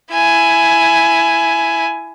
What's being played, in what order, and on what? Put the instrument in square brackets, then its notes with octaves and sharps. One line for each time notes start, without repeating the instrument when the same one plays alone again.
[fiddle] E4 G#5